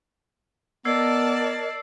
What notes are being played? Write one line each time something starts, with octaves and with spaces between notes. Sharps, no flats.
B3 A#4 D5 D#5 A5 E6 G#6 C7